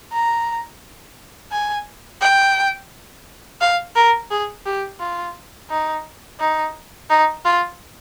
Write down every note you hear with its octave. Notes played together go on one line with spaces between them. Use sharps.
A#5
G#5
G5
F5
A#4
G#4
G4
F4
D#4
D#4
D#4
F4